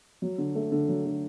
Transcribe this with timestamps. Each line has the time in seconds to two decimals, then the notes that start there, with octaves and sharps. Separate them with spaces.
0.22 F#3
0.38 D3
0.55 A3
0.72 D3
0.88 F#3
1.05 D3